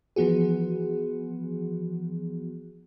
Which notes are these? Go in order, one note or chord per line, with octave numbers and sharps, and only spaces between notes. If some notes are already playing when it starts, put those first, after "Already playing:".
E3 F3 B3 F#4 G#4